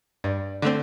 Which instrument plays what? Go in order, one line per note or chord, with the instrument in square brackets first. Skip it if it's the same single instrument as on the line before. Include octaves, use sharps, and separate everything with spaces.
[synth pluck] G2 [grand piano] D5
[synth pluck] D3 A3 C4 [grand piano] D5